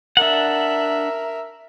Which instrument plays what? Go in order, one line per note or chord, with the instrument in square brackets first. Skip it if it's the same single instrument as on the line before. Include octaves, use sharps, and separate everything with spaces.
[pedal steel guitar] D4 F#5 [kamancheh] A#4 E5